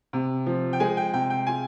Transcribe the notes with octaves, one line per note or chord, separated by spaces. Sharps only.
C3
F3
G5
G#3 G#5
G5
C3 G5
G5
F4 G#5